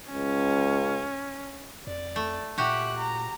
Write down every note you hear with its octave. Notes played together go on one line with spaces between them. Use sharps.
C#2 C#4
F2 D5
A3
A#2 F#4 G4 E5 F#6
A#5